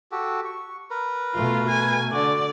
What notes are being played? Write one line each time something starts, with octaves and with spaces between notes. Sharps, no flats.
F#4 G4 A4
C#6
A#4 B4
B2 A3 F4
G#5
D3 F#4 D5